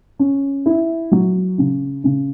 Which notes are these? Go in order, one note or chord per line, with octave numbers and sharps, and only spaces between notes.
C#4
E4
F#3
C#3
C#3